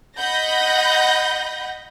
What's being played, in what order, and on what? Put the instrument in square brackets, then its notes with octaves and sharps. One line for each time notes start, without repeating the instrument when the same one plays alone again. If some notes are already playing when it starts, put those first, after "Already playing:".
[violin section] D#5 F#5 B5 G6 A#6